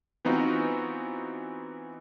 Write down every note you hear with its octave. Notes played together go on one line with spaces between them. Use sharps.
E3 B3 C4 D#4 F4 F#4